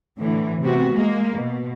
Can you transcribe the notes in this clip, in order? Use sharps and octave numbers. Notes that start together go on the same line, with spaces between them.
A2 D3 E3
C3 B3 F#4
G#3 A#3
B2